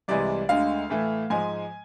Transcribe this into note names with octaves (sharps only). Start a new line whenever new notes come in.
C2 C3 E3 G#3 D5
D2 D3 G#3 F5
A2 E3 A3
G#2 F3 G#3 G#5